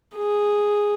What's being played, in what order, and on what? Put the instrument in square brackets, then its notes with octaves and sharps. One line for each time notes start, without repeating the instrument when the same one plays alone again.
[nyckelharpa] G#4